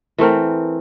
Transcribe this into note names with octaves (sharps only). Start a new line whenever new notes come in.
E3 A3 C4 A#4